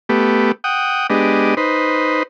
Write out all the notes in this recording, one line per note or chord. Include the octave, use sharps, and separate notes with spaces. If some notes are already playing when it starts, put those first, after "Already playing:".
A3 B3 G4
F#5 G5 D#6
G#3 B3 D4 G4 D#5
D#4 B4 C5